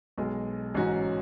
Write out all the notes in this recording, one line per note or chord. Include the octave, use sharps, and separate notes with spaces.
B1 B2 G#3
A1 G#2 F#3 C#4 F#4